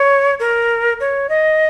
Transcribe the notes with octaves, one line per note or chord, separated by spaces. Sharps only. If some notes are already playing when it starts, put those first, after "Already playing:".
Already playing: C#5
A#4
C#5
D#5